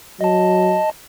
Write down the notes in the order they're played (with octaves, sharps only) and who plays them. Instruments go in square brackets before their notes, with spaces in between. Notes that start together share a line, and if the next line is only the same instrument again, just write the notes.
[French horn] F#3 [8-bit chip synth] D#5 A5